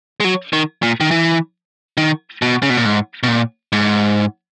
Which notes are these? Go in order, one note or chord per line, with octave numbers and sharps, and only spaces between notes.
G#3
F#3
D#3
A#2
D#3
E3
D#3
B2
C#3
B2
A#2
G#2
B2
A#2
G#2